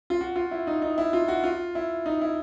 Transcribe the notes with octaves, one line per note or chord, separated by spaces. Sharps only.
F4
F#4
F4
E4
D#4
D#4
E4
F4
F#4
F4
E4
D#4
E4